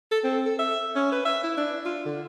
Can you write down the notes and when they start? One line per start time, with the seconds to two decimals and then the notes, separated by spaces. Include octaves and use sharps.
0.11 A4
0.24 C4
0.46 A4
0.59 E5
0.96 C#4
1.12 B4
1.25 E5
1.43 E4
1.57 D4
1.85 F4
2.06 D3